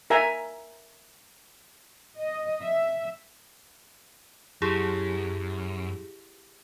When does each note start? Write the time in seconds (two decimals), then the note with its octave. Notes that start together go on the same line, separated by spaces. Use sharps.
0.10 A#4 E5 G#5 A#5
2.18 D#5
2.63 E5
4.62 F#2 E4 G4 G#4